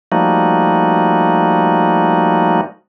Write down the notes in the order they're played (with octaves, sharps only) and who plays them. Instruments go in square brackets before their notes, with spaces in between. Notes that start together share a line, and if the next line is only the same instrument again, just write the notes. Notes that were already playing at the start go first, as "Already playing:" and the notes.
[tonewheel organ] F3 G3 A3 A#3 D#4 F#4